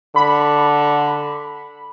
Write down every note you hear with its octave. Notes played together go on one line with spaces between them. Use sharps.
D3 B5